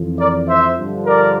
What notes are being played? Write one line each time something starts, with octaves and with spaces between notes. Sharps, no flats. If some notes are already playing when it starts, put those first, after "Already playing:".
Already playing: F2 E3
A#4 D5
C5 E5
G2 D3 F3
A#4 D5